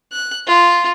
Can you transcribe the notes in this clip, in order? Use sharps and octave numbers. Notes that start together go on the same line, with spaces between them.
F#6
F4